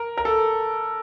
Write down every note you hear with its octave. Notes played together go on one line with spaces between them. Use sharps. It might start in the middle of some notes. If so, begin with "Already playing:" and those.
Already playing: A#4
A#4
A4